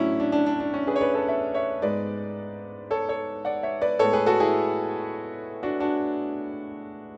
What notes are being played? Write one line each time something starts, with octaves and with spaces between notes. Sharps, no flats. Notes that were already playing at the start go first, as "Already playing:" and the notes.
Already playing: A2 F#3 A3 C#4 D4 E4 F#4
D4
D4
D4
D4
C#4
G#4 B4
C#5
B4 D5
A4 C#5
C#5 E5
C#5 E5
G#2 G#3 B3 B4 D5
A4 C#5
A4 C#5
D5 F#5
C#5 E5
B4 D5
A2 G#3 B3 A4 C#5
G#4 B4
F#4 A4
E4 G#4
D4 F#4
D4 F#4